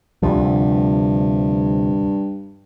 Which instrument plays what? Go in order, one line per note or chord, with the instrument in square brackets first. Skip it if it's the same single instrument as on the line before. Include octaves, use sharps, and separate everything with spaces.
[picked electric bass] D2 C3 F3 [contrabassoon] G2